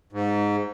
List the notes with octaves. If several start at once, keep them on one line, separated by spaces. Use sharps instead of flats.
G#2